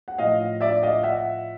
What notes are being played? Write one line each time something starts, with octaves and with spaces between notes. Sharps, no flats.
F#5
A2 F3 D#5 F5
D5 E5
D#5 F5
E5 F#5